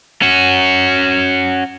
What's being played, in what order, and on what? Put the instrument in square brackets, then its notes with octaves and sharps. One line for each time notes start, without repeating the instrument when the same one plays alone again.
[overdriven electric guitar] C#4 F#4